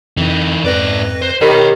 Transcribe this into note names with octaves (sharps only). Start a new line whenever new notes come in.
F2 E3 D#4
F2 G#2 B4 D5 A#6
C5
D#3 G4 C#5 B5